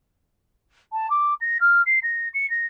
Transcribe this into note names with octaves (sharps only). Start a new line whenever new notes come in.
A5
D6
A#6
F6
C7
A#6
C#7
A#6